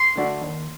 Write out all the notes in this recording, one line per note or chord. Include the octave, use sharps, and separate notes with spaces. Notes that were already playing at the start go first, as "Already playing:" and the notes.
Already playing: C6
D3 A3 D4 F#4
D#2